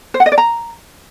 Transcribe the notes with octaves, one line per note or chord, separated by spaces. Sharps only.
C5
F#5
D#5
D5
A#5